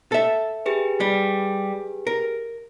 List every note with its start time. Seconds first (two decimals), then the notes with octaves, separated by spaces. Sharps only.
0.12 A4 E5
0.66 G4 G#4 B4
1.00 G3
2.07 A#4